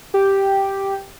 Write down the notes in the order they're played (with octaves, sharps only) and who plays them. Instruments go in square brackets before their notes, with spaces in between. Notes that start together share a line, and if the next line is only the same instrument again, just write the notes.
[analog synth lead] G4